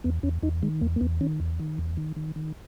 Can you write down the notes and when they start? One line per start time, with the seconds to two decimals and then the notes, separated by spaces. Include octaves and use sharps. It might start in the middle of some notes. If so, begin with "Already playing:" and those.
0.04 E2 B3
0.23 E2 C#4
0.43 E2 D#4
0.63 D#3 G#3
0.81 E2 A#3
0.96 A#3
1.01 E2 B3
1.21 D#3 C#4
1.40 E2
1.60 D#3
1.78 E2
1.97 D#3
2.16 D#3
2.36 D#3